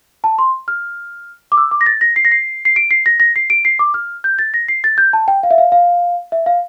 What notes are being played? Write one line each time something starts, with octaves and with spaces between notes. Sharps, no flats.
A5
C6
F6
D6
E6
D6
A#6
A6
A#6
C7
A#6
C7
C7
D7
C7
A#6
A#6
C7
D7
C7
D6
F6
G6
A6
A#6
C7
A6
G6
A5
G5
F5
E5
F5
F5
E5
F5